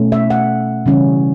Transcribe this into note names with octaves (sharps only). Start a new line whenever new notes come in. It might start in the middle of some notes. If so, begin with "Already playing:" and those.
Already playing: B2 A3 C#4
E5
F#5
C#3 E3 G3 C#4